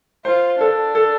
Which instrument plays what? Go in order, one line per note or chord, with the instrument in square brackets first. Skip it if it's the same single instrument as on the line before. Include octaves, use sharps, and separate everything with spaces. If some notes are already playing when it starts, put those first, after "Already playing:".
[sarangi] F4 [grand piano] C5
[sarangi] D4 [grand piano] A4
[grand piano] A4